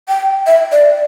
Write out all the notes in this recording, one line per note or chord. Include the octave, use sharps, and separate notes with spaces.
G5
E5
D5